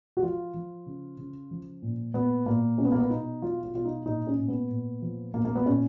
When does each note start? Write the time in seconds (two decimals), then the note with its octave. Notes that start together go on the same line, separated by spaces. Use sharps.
0.17 F#4
0.22 F3 F4
0.54 F3
0.86 C#3
1.18 C#3
1.51 F3
1.82 A#2
2.14 A#2 B3
2.46 A#2 A#3
2.78 B2 C#4
2.85 B3
2.92 A#3
2.99 B3
3.10 B2 D#4
3.42 F#3 F4
3.63 F4
3.74 B2 F4
3.85 D#4
4.06 A#2 D#4
4.27 C#4
4.38 A#2
4.48 B3
4.70 A#2
5.02 F3
5.34 A#2 A#3
5.45 A#3
5.56 B3
5.66 A#2 C#4